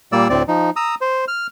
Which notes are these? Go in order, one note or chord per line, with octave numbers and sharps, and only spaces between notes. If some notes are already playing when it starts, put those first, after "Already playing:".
A#2 G3 A#3 D5 E6
D2 A2 C4 D5
F3 D#4
A#5 D#6 E6
C5
F6